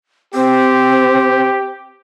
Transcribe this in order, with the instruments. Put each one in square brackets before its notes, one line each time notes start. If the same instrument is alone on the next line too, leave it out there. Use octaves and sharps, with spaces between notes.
[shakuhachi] C4 [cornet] G4